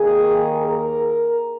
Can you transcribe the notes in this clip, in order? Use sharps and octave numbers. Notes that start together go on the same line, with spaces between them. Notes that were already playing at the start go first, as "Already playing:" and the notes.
Already playing: D#2 D#3 A#3 G#4
A#4